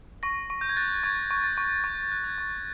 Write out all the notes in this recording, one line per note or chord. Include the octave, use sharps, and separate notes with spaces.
C#6 A#6
C#6
G6
G#6
F#6 A6
C#6 G#6
C#6
A6
C#6
C#6 G6
F#6
G#6
C#6